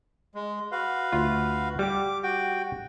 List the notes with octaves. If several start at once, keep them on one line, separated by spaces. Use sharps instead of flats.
G#3
F#4 B4 F5
D2 F4
G3 G4 D6
F#4 G5